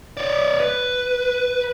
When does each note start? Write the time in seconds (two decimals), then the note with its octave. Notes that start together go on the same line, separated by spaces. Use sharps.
0.17 C#5 D5
0.60 B4